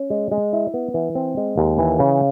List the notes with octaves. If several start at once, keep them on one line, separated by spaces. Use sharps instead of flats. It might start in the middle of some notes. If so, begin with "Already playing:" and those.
Already playing: C#4
G#3
G#3
E4
B3
E3
C4
G#3
D#2
E3
C#3